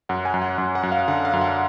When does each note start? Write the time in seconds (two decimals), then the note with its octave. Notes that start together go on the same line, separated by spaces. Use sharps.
0.09 F#2 F#5
0.25 G#5
0.34 F#2
0.42 F#5
0.58 F#2
0.75 F#5
0.83 F#2
0.92 F5
1.08 D3 F#5
1.25 F5
1.33 F#2
1.41 F#5